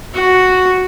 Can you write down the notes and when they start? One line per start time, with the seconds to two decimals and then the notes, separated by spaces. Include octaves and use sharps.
0.14 F#4